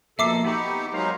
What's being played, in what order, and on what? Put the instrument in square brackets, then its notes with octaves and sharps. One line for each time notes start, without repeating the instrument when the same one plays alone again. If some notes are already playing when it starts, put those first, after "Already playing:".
[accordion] B2 A4 [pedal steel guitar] F3 A#3 [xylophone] E5 D6 C7
[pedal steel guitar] B3 B5 C#6 [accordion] D#4 G4
[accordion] F#3 G#3 D#4 [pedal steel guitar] A#4 C5 F5